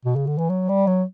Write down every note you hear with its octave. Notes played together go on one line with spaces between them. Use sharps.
B2
C#3
D3
E3
F#3
G3
F#3